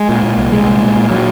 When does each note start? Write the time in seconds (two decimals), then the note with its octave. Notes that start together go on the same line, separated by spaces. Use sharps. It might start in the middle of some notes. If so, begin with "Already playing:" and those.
Already playing: G#3
0.09 A#2
0.23 A#2
0.38 C2
0.52 C2 G#3
0.67 A#2
0.81 A#2
0.96 A#2
1.11 F#3